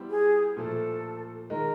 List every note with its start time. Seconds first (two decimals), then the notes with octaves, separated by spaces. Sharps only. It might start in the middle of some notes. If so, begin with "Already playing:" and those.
Already playing: G3 B3 E4 G4 C5
0.10 G#4
0.57 A#2 F3 A3 A4
1.50 D#3 G#3 A#4